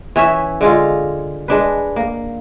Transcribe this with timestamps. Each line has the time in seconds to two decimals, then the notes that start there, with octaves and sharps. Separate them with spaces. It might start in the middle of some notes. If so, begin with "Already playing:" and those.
0.16 E3 C#4 E5
0.61 D3 G#3 F4
1.48 G#3 D4 B4
1.96 A#3